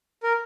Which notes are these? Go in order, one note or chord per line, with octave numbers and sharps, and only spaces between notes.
A#4